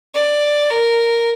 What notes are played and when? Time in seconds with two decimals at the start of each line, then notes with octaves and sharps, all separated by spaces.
0.15 D5
0.71 A#4